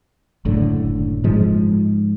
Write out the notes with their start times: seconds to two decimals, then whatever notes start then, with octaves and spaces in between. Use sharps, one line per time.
0.45 F#1 A2 D3
1.24 G#2 F3 G#3